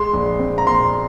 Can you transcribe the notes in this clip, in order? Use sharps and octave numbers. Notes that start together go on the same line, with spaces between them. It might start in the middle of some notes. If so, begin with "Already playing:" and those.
Already playing: G#3 C6
A#1
C4
A#5
A#2 C6